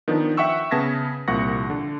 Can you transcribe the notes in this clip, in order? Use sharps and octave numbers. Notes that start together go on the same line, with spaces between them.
D#3 F3 B3 D4
E5 F#5 G5 C#6 E6
C#3 B3 A5 G#6 A#6 B6
C2 A#2 F3 F#5 C#6 A#6
D3